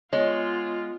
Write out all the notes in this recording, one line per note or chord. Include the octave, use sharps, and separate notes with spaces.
G#3 B3 F4 C#5